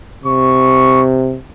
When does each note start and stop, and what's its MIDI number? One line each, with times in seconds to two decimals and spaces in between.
0.24 1.37 48
0.24 1.02 85